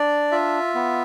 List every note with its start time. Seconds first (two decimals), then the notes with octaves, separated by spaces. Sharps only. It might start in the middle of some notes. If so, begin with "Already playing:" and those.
Already playing: D4 D5
0.32 F4 E5
0.75 B3